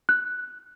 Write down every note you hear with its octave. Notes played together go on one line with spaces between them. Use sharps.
F#6